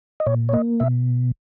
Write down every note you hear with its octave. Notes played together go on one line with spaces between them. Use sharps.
D#5
A#2 C#5
C#5
A#3 D#5
B2 E5